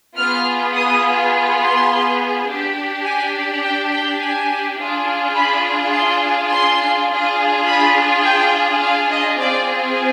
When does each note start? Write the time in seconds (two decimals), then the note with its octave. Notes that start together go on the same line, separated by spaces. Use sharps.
0.16 B3 F4 G#4 F6
0.74 D#6
1.60 C6
2.46 D4 G4
3.04 G#5
3.63 G5
3.91 G5
4.20 G#5
4.78 D4 F4 G#4
5.35 B5
5.93 C6
6.50 C6
7.08 D4 F4 G#4
7.66 B5
8.24 G5
8.81 F5
9.11 D#5
9.39 C4 F4 G#4 D5